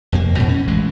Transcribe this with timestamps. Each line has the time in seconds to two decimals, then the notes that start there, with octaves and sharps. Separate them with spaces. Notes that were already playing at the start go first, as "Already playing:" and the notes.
0.12 F1 F2 A#3
0.36 G#2 B2 E3 F#3
0.49 C#4
0.68 A1 E3 G#3